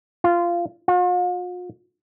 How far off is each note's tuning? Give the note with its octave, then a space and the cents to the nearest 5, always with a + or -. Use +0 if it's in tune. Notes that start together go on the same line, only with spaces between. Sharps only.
F4 -15
F4 +45